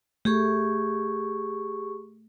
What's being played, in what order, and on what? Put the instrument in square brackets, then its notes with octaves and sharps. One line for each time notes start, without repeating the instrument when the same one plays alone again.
[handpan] A3 [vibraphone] G4 G#4 C#6